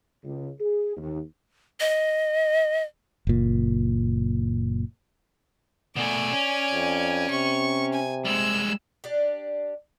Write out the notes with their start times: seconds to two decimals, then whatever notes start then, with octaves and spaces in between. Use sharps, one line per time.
0.24 C#2
0.60 G#4
0.97 D#2
1.80 D#5
3.27 F#1 A#2
5.96 B2 A3 D5 G#5
6.33 C#4
6.72 F2
7.30 C3 C#6
7.93 G#5
8.25 G3 G#3 E6
9.04 D4 G4